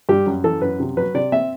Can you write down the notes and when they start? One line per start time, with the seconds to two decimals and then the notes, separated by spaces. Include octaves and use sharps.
0.09 G2 G4
0.26 F#2
0.44 E3 A4
0.61 F#2 B4
0.80 C3
0.97 F#3 B4
1.15 C3 D5
1.32 C4 E5